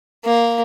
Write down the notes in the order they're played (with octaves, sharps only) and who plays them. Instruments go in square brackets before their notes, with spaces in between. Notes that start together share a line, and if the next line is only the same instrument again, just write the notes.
[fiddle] A#3